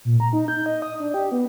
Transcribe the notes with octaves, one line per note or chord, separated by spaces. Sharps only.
A#2
A#5
D#4
G6
D#5
D#6
D4
G4
B3